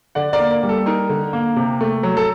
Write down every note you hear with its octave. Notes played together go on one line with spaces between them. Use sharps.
D3 D5 F#5
A#4 D5
A#3
A#4
G3
A4
D#4 A#4
D3
A#3
C3
A3
F#3
A4